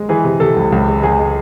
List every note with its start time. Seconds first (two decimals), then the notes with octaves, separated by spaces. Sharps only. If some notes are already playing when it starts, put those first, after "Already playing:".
Already playing: G#3
0.09 E3 G#4
0.24 C3
0.40 C3 A4
0.56 C#2
0.72 C#2
0.88 G#3
1.03 C#2 G#4
1.19 G#3